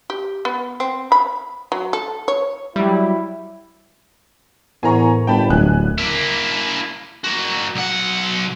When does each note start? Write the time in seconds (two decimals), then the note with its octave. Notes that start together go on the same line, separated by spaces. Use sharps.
0.10 G4
0.45 B3
0.80 C4
1.12 B5
1.72 F#3
1.93 A4
2.28 C#5
2.76 F#3 G3 E4
4.83 E2 A2 A#4 C5 G#5 A#5 C#6
5.27 G1 G5 A5 B5
5.50 D1 G#5 F#6
5.98 A#3 E4
7.24 A#3 F#4
7.75 B1 F#5